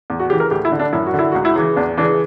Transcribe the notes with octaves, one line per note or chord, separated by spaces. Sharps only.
E2
F#4
C#3 E3 G4
A#4
D2 G4
E4
D3
D4
F#2 E4
F#4
D3
E4
C#2 F#4
E4
C#3 E3
E2 D4
C#3 E3 D4